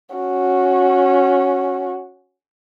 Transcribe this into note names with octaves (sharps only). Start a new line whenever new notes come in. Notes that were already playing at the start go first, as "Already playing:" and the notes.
C#4 F#4